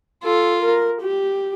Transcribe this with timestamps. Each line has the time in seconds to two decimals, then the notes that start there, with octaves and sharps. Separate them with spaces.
0.23 F4 A4
0.62 A#4
1.02 G4